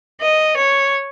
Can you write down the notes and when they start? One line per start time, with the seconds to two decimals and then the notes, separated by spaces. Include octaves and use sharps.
0.21 D#5
0.57 C#5